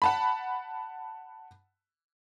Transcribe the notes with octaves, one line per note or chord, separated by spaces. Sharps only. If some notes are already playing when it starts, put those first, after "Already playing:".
F#5 A5 B5